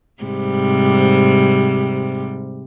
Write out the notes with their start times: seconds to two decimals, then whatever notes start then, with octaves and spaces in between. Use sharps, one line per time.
0.23 G#2 C3 G3